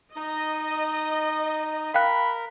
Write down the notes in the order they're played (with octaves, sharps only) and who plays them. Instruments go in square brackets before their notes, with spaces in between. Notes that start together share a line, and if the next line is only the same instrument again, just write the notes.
[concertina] D#4 [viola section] D#5
[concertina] A#4 [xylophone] F5 G5 F#6 [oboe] B5